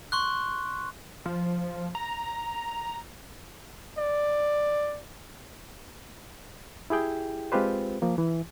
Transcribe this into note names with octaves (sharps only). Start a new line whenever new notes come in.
C6 C#6 F#6
F3
A#5
D5
E4 G4 G#4 G5
G#3 C4 F4 G4 B4 C5
F3 A#3
E3